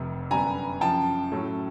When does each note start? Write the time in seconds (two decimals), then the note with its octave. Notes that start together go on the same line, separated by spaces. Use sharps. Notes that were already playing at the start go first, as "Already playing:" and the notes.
Already playing: F1 F2 C3
0.30 F#2 D3 G3 B3 G#5 A#5
0.81 F#2 C#3 F3 G5 A5
1.32 A2 F#3 A3 C#4